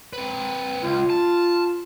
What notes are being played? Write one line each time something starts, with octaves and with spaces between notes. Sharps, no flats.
C4 B4
C#2 F4
A5